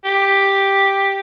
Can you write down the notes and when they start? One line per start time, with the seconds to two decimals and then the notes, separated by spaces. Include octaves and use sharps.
0.05 G4